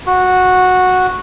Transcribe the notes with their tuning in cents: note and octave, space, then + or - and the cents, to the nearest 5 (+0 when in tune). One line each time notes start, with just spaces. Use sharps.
F#4 -10